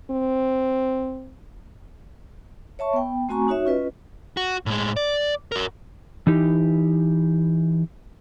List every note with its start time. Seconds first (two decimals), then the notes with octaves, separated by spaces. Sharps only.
0.11 C4
2.79 C#5 E5 A5 C#6
2.93 B3 G5
3.29 A3 C4 F#4 G#5 A#5 C#6
3.48 D#4 F#4 C#5 E5
3.66 C#4 F4 B4 D#5
4.37 F#4
4.66 A2 G#3
4.97 D5
5.52 F#4 A#4
6.27 E3 D#4 G4